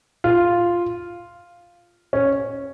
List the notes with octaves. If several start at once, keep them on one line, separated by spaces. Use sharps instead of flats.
F4
C#4